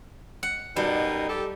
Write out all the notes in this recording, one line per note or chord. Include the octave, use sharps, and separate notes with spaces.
F#5
F#2 B2 G3 D#4
G4 A4